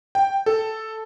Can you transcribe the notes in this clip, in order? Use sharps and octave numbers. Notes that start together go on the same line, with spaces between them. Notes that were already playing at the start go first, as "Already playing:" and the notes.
G5
A4